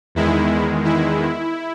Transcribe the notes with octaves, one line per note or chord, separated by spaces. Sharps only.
E2 D#3 G#3 E4
E4